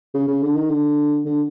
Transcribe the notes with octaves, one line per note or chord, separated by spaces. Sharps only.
C#3
C#3
D3
D#3
D3
D3